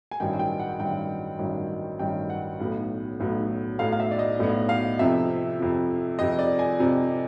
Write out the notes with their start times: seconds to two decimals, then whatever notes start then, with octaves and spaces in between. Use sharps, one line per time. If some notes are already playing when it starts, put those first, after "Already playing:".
0.11 G#5
0.20 A1 G2 D#3 F#3 G5
0.39 G5
0.59 F#5
0.79 A1 G2 D#3 F#3 G5
1.39 A1 G2 D#3 F#3
1.99 A1 G2 D#3 F#3 G5
2.30 F#5
2.60 B1 A2 F#3 B3
3.20 B1 A2 F#3 B3
3.79 B1 A2 F#3 B3 F5
3.93 F5
4.00 E5
4.11 D5
4.19 D#5
4.39 B1 A2 F#3 B3
4.69 F5
4.99 F2 C3 F3 E5
5.59 F2 C3 F3
6.19 F2 C3 F3 D#5
6.39 D5
6.59 G#5
6.80 F2 C3 F3